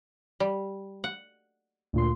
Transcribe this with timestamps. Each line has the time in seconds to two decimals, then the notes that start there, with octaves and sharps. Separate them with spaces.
0.40 G3
1.04 F#5
1.93 D2 A#2 C6